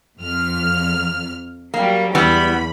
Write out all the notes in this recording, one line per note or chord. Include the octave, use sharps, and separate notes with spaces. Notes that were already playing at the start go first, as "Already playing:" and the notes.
F2 F6
F#3 G3 A#3
E2 E3 G3 B3 B5